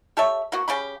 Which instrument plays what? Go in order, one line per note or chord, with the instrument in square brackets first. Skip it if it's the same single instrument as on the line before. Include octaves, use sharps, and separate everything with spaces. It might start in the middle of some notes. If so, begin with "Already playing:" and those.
[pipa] G4 A4 C#5 E5
A#3 B3 F#4
C#3 G4 B5